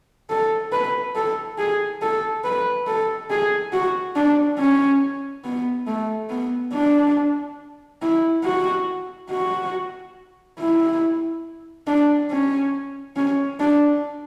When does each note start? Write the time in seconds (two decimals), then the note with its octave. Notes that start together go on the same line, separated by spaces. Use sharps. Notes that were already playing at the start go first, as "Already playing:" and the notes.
0.30 A4
0.72 B4
1.16 A4
1.58 G#4
2.02 A4
2.44 B4
2.87 A4
3.30 G#4
3.72 F#4
4.16 D4
4.59 C#4
5.44 B3
5.87 A3
6.30 B3
6.73 D4
8.02 E4
8.44 F#4
9.30 F#4
10.59 E4
11.87 D4
12.30 C#4
13.16 C#4
13.60 D4